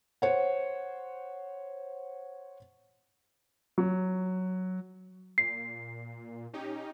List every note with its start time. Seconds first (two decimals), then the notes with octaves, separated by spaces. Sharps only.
0.22 C5 C#5 F#5
3.78 F#3
5.38 A#2 C7
6.53 C#4 D#4 G4